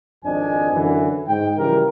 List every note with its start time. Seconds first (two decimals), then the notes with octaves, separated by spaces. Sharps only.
0.25 G#1 F2 C4 D4 D#5 G#5
0.74 F#2 D3 E3
1.28 G#2 G5
1.58 C#3 E3 F3 G3 G4 A#4